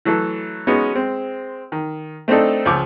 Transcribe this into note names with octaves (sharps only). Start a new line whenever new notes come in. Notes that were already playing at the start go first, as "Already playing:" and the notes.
E3 F#3 A3 A4
G#3 B3 C#4 D#4 F#4
G#3 C4
D#3
A3 C4 D4 D#4 A4
C#2 F3 D6 E6